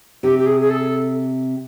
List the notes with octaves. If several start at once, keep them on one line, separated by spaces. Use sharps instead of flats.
C3 G4
G4
G#4
G#4
A4